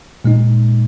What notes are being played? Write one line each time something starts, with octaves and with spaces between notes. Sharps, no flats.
A#2 G#3 D#4